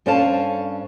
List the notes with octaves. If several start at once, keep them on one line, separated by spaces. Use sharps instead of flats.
G2 C4 C#4 A4 F5 A5